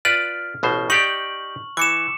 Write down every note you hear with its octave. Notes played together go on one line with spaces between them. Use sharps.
F4 B4 D5 F6
A1 B2 C5
D#4 G4 D5 C#6 F#7
E3 D6 C#7 E7